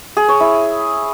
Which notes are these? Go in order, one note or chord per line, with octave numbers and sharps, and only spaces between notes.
G#4
C#5
E4